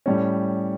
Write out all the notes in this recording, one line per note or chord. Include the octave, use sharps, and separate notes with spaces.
A2 G3 C#4